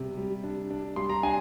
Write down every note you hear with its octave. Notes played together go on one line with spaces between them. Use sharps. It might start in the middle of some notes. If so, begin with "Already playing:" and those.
Already playing: C3 G3
G3
D4
D4
G3 C6
A#5
D4 G#5